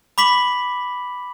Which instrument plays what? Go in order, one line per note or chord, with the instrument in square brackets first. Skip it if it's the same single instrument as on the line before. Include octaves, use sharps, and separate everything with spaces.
[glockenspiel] B5 D6 B6 F#7